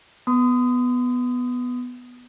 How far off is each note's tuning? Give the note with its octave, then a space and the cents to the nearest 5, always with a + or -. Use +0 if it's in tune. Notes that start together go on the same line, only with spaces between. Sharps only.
B3 +0 C6 -45 D#6 +0